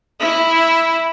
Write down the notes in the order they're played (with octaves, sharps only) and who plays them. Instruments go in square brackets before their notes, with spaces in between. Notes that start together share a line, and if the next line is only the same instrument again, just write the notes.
[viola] E4